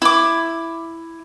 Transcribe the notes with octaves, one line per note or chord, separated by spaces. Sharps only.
E4 D6